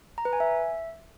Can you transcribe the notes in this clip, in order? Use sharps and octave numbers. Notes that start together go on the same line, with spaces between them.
A#5
B4
G#5
E5